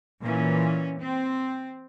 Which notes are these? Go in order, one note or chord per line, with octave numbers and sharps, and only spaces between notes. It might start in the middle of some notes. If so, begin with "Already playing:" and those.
A#2 E3 C#4
C4